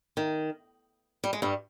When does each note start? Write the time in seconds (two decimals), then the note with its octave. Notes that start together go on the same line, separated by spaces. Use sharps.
0.17 D#3
1.24 G3
1.33 G#3
1.42 G2 G3